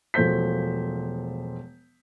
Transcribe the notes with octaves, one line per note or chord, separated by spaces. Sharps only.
E1 F3 A3 C5 G6 B6